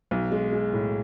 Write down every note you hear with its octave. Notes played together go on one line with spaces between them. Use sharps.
B1
G#3
G#3
A2